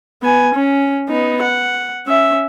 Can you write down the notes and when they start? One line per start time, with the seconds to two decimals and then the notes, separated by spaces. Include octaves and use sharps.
0.22 B3 G#5
0.54 C#4
1.09 B3 D#4
1.42 F#5
2.06 C#4 E5